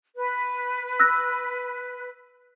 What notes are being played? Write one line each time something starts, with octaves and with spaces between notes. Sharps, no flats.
B4
E6 F#6 A#6